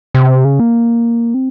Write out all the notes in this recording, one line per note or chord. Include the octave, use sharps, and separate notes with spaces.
C3
C#3
A#3
C4